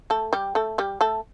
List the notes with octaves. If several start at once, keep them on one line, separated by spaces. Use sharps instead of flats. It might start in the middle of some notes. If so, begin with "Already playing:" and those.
A3 A4
G3 G4
A3 A4
G3 G4
A3 A4